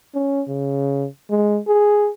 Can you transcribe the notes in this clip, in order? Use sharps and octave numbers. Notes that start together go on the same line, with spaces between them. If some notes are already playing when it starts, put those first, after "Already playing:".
C#4
C#3
G#3
G#4